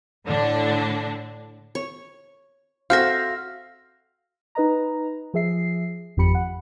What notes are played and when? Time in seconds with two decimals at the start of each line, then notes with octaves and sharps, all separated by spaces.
0.26 A2 D3 D4
1.75 C#5
2.90 C4 F#4 A4 E5 F5 F6 A#6
4.55 D#4 B4 D#5 A#5
5.34 F3 G#4 E5 C7
6.17 G#1 F2 F3 G4 B5 C#7
6.35 F#5